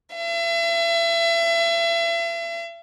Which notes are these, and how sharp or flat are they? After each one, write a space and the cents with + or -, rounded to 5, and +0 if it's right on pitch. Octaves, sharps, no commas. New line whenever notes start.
E5 +40